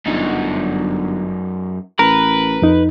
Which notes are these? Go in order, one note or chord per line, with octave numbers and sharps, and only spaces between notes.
G1 F#2 D#4
A1 A#4 B4
F2 D#4